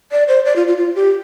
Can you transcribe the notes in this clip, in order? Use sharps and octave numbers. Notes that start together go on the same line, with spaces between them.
D5
C5
D5
F4
F4
F4
G4